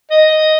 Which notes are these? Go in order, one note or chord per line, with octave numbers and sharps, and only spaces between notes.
D#5